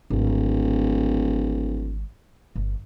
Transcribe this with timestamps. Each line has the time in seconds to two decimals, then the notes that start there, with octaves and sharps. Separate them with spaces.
0.10 D1 G#1
2.56 G1